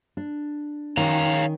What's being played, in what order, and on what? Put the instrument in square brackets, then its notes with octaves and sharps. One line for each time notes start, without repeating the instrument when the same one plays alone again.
[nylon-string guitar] D4
[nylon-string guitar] D#3 C#4 [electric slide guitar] C#5 F5 A#5